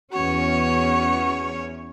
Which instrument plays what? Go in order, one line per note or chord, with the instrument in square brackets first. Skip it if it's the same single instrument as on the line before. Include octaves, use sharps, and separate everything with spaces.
[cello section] E2 C#4 [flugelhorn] F#4 [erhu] C#5